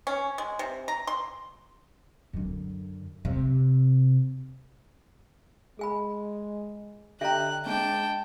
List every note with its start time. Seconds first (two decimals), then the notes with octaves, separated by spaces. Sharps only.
0.07 C#4
0.38 G#3
0.59 C3
0.88 A#5
1.07 C6
2.33 F#2 D3
3.25 C3
5.79 G#3 G#4 G#5 B5
7.21 D3 G4 D#5 E5 G5 A#5 F#6
7.66 G#3 C#4 D4 G5 A5